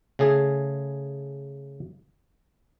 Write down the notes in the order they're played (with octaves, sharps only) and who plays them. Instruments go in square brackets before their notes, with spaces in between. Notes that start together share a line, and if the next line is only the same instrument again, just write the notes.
[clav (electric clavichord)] C#3 A3 G#4